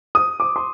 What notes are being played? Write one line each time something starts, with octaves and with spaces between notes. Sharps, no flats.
D#6
D6
C6